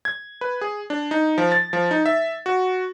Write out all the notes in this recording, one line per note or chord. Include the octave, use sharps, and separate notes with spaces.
G#6
B4
G#4
D4
D#4
F3
A6
F3
D#4
E5
F#4